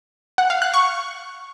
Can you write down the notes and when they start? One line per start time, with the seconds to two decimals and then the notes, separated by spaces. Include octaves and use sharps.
0.38 F#5
0.50 F5
0.62 F#6
0.74 C#6